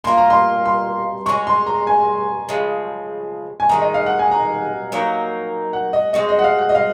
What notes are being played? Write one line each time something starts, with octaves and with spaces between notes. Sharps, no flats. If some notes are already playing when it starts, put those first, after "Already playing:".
A#3 F4 A#4 C6
A#5
C6
C6
G#3 C#4 F#4 C#6
C6
A#5
G#5
C#3 F3 G#3
G#5
D#3 G#3 D#4 A#5
D#5
F5
F#5
G#5
A#5
F#3 A#3 D#4 A#4
F#5
D#5
G#3 C4 F#4 D#5
D#5
F#5
F5
F#5
D#5
F5